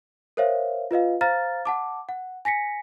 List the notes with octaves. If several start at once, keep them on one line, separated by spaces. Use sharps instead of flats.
A#4 C5 C#5 E5 F5
F4 B4 D#5 F5
C5 F5 A#5 F6 A6
F#5 A5 D6
F#5
G#5 A#6 B6 C#7